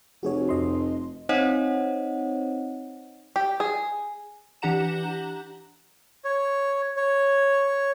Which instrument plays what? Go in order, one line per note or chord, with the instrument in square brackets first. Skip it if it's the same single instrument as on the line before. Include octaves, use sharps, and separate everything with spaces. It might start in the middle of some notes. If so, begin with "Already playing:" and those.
[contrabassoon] F1 [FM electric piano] F#4 G#4 C#5
[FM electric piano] F2 D#5 C6
[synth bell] C4 D#4 C5 C#5 D#5 F#5
[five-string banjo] G4
G#4
[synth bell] E3 D4 G4 F#5 A#5 E7
[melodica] C#5
C#5